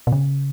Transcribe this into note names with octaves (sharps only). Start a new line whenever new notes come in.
B2
C#3